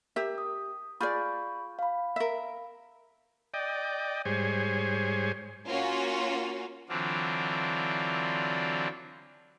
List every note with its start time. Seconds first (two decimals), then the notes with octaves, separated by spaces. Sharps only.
0.16 G4 A#4 E5
0.38 D#6
1.01 F4 G#4 D5 B5 C#6 G6
1.79 F5 B5
2.16 A#4 E5
3.54 D5 D#5 G5
4.25 G#2 G3 G#4 C5 C#5 G#5
5.67 A#3 C#4 F4 F#4
6.89 D3 E3 F#3 C4 D4 F4